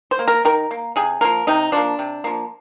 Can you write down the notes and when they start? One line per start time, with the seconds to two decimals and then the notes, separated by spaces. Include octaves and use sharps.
0.11 C5
0.19 A#3
0.28 A#4
0.45 D#3 A#4
0.71 A#3
0.96 C3 G#4
1.21 F3 A#3 A#4
1.47 C3 D#4
1.72 F3 A#3 D4
1.99 C3
2.24 F3 A#3